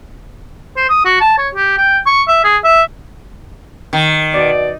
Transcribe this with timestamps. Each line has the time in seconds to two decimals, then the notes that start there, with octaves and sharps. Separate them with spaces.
0.76 C5
0.89 D#6
1.05 F#4
1.21 A5
1.38 C#5
1.55 G4
1.78 G5
2.06 C#6
2.28 E5
2.44 G#4
2.64 E5
3.93 D#3
4.33 B2 D5